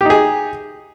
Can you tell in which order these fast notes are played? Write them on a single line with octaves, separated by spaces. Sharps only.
G4 D#4 G#4